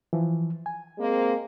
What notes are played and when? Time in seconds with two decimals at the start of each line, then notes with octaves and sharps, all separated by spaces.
0.13 E3 F3
0.66 G#5
0.99 G#3 A#3 C4